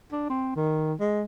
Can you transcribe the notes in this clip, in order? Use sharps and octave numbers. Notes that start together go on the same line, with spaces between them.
D4
C4
D#3
G#3